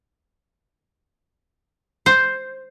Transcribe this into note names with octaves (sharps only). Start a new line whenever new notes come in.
C5